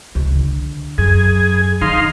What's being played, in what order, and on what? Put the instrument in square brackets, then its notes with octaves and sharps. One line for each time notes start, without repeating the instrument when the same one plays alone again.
[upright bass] C#2
D3
[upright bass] F#2 [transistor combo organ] G#4
[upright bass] D#3 [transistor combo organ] D#4 F5 C6